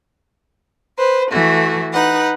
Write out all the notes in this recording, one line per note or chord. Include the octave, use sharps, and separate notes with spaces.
B4 C5
E3 A3 F#4
D#4 B4 F#5